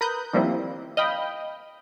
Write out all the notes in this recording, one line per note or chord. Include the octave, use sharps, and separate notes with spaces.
A#4 B4 D#6 F#6 G6
D#3 F3 G3 A#3 C4 E4
D#5 F5 G5 B5